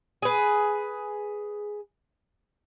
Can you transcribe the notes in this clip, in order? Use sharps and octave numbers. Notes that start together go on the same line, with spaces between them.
G#4 B4